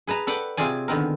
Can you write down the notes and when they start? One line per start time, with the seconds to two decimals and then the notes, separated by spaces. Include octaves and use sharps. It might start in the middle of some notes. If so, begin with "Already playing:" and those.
0.07 G#4 B4 A5 A#5
0.27 A4 B4 D5 F#5 G5
0.57 C3 C4 F4 G#4 D5 G#5
0.88 D3 D#3 B3 C4 A#4